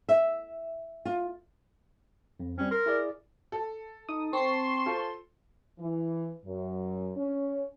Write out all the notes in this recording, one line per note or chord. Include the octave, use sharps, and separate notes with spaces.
E5
F4
F2
G3 C4 C#4
A#4 C6
E4 G#4 D5
A4
D#4 D#6
C4 A5 C6 C#6 C7
F4 A4 C5
E3
F#2
C#4